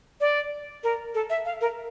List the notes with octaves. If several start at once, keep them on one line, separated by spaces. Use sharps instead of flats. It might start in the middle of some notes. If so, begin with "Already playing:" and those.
D5
A#4
A4
E5
F5
A#4